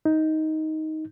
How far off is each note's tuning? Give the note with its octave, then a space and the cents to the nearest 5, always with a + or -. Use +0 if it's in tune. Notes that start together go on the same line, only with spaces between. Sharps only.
D#4 +10